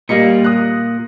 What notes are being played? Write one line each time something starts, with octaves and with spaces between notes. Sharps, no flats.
A#2 G3 A#3 D#5 C#7
D#6 F#6